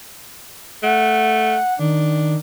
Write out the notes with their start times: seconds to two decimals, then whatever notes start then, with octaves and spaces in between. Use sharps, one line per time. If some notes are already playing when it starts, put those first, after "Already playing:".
0.83 A3 F#5
1.80 D#3 D4